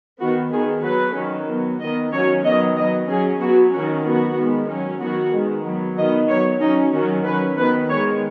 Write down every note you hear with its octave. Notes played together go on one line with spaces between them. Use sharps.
D#3 B3 F#4
D#3 B3 G#4
F#3 B3 B4
D#3 F#3 C#4
F#3 B3
D#3 B3 D#5
D#3 F#3 C#4 C#5
D#3 F#3 B3 D#5
F#3 B3 D#5
F#3 C#4 G#4
F#3 B3 F#4
D#3 F#3 C#4 F#4
F#3 B3 F#4
D#3 G#3 B3
F#3 C#4
D#3 F#3 B3 F#4
D#3 G#3 B3
F#3 B3
D#3 B3 D#5
F#3 B3 C#5
F#3 C#4 D#4
D#3 F#3 C#4 F#4
F#3 C#4 B4
D#3 B3 B4
D#3 G#3 B3 C#5